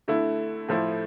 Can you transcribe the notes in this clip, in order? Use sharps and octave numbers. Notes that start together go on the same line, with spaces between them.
D3 A3 E4
A2 F3 A3 E4